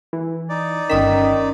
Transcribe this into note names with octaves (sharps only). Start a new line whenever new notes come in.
E3
D#4 D5
G1 D#3 C#4 D#6 B6